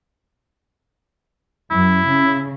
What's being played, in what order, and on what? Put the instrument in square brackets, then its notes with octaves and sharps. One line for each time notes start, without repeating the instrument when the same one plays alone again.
[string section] F#2 [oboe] E4
[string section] C#3